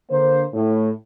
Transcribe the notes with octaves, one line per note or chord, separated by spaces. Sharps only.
D3 A#3 C5
A2